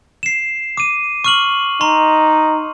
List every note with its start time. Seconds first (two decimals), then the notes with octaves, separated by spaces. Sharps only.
0.23 C7 E7
0.77 D6 D#7
1.24 C#6 F6 F#7
1.81 D#4 A#5 C6